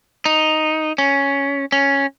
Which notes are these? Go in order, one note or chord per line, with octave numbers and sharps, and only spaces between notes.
D#4
C#4
C#4